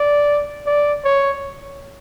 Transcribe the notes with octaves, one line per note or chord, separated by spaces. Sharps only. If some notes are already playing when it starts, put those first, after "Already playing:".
Already playing: D5
D5
C#5